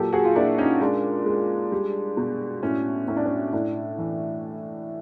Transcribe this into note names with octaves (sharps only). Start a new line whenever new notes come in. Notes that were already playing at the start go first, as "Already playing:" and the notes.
Already playing: A#2 F#3 G4 A4
F#4 G#4
F4
A#2 D4 E4
C#4 D#4
G#3 D4
G#3
G3
B2
A2 C#4
A2 C#4
D4
C#4
A2 D4
E3